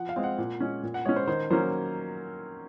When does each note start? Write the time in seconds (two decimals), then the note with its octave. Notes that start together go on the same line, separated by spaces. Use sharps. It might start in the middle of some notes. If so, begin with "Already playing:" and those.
Already playing: F3 F#5
0.09 F5
0.16 G#3 C4
0.24 F#5
0.38 A#2
0.60 G#3 C#4
0.83 A#2
0.94 F#5
1.05 G#3 C#4 C#5
1.16 C5
1.27 D#3 C5
1.50 F#3 A#3 C#4 C5